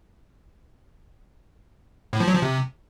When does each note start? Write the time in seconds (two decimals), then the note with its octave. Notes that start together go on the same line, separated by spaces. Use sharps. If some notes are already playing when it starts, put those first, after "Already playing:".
2.13 A2
2.20 F3
2.28 F#3
2.35 F3
2.42 C3